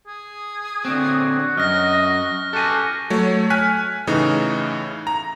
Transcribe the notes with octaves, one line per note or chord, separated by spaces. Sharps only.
G#4
D3 C4 F#4
F#2 F#4 D#5 F6 A#6
F#4 G4 A4 G#5
F#3 A3 C#5
G#5 F6 F#6 B6
A2 C#3 E3 D#4
A#5